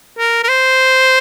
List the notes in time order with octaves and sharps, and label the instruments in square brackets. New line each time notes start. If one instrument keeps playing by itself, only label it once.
[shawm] A#4
A#4
C5